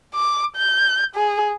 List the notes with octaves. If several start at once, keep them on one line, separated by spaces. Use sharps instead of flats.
D6
G6
G#4